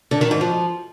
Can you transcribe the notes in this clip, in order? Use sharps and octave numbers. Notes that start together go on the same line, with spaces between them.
D3
D#3
G#2
F3